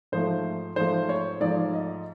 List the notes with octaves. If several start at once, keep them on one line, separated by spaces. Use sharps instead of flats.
G#2 F3 A3 C5
G#2 F3 A3 C5
C#5
G#2 F3 A3 D5
D#5